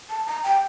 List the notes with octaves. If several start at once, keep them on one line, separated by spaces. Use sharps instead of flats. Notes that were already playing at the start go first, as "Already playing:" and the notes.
A5
A#5
G5